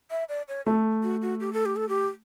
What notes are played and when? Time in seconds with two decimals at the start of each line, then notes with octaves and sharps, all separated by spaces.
0.11 E5
0.29 D5
0.48 C#5
0.66 A3 A4
1.03 F#4
1.22 F#4
1.40 G4
1.53 A4
1.65 G4
1.76 A4
1.89 G4